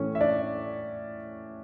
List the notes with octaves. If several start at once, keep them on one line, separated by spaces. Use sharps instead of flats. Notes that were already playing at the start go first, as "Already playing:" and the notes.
Already playing: A2 E3 A3 C#4 C#5
E5
D4 D5